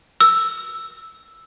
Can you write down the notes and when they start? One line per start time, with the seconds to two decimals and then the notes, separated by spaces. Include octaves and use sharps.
0.21 E6